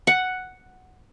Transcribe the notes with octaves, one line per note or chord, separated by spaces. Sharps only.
F#5